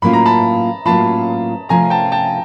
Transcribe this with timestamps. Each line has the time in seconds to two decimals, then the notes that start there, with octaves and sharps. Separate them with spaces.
0.02 A2 F#3 A#3 C#4 F4 B5
0.13 A#5
0.26 A5 B5
0.85 A2 F#3 A#3 C#4 F4 A5 B5
1.69 C3 F3 A3 C#4 F4 G#5 A#5
1.90 G5 A5
2.12 G5 A5